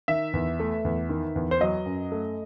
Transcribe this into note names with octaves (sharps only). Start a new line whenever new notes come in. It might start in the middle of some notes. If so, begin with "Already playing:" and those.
D#3 E5
E2
A3
E2
D#3
E2
C5
F#3 D#5
F#2
A3